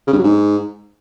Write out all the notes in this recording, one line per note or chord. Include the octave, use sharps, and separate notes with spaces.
C#3
G2
F#3
G#2